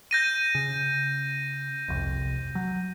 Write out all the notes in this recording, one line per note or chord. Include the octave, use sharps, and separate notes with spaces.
G6 A#6 D#7
C#3
G1 C2 F2
F#3